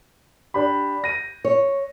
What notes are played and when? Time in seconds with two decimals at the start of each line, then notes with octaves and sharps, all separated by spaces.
0.54 D4 G4 B5
1.04 A#6 D#7
1.45 C#5